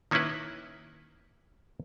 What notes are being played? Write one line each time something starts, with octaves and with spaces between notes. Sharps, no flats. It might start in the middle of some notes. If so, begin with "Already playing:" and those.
D#3 A#3 C#4 D#4 E4 B4